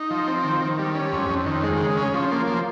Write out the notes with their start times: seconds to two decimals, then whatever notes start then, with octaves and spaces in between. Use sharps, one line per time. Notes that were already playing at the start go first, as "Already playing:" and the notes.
Already playing: D#4
0.11 F3
0.28 C4
0.44 D#3
0.61 D#3
0.79 G3
0.95 C#4
1.12 F2
1.29 F2
1.46 D#3
1.63 G#3
1.80 C#3
1.97 C#4
2.14 F3
2.32 A#3
2.48 F3